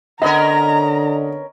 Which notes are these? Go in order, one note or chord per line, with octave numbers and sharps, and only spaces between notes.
D3 B3 C#4 A#4 D#5 A#5